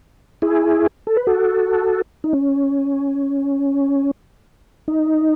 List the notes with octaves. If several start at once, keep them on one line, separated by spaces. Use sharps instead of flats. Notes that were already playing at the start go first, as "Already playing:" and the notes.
E4 G#4
A4
B4
F#4 A4
D#4
C#4
D#4